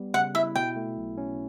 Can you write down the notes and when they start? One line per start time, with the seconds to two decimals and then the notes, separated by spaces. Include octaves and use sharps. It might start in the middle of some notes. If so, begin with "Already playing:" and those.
Already playing: G3 B3
0.14 C#3 F#5
0.35 E4 E5
0.56 B2 G5
0.76 A3
0.98 B1
1.18 C#4